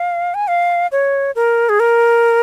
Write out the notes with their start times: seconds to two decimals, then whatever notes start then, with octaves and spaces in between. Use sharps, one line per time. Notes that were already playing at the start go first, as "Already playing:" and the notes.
Already playing: F5
0.34 G#5
0.48 F5
0.92 C#5
1.36 A#4
1.69 G#4
1.80 A#4